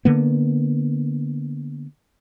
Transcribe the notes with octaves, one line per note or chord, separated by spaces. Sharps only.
D3 A#3 B3